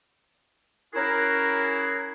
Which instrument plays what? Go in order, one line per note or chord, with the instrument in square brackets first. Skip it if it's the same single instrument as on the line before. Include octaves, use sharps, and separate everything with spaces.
[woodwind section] C#4 E4 F#4 G#4 A#4